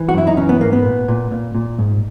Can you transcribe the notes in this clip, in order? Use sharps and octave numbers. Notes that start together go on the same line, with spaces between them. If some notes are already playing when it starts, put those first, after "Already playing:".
Already playing: E3
F#4
F#2 E4
D#4
E3 C#4
B3
G#2 A#3
B3
A#2
A#2
A#2
A#2
G#2